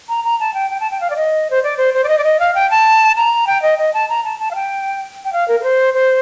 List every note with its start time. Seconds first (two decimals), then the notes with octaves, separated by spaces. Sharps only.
0.09 A#5
0.24 A#5
0.40 A5
0.54 G5
0.71 G5
0.80 A5
0.91 G5
1.01 F5
1.10 D5
1.16 D#5
1.51 C5
1.63 D5
1.77 C5
1.94 C5
2.04 D5
2.08 D#5
2.18 D5
2.24 D#5
2.40 F5
2.55 G5
2.71 A5
3.17 A#5
3.47 G5
3.62 D#5
3.78 D#5
3.94 A5
4.09 A#5
4.25 A5
4.40 A5
4.51 F5
4.55 G5
5.24 G5
5.33 F5
5.48 A#4
5.60 A#4
5.64 C5
5.94 C5